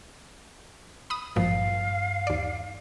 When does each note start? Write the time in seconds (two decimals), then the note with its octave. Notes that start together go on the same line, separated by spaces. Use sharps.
1.10 B5 D#6
1.36 G#1 G2 A#2 F3 F5
2.27 D#2 D5